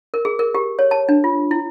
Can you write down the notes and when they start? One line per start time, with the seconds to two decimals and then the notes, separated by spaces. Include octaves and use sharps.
0.14 A#4
0.25 G#4
0.39 A#4
0.55 G4
0.79 C#5
0.91 A5
1.09 D4
1.24 F4
1.51 E4